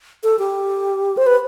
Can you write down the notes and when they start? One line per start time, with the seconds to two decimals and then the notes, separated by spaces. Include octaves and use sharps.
0.23 A4
0.39 G4
1.17 C5
1.27 B4